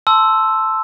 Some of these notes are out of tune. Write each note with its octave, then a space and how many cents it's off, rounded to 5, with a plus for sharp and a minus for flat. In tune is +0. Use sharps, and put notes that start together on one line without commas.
A5 +0 C6 +0 E6 +0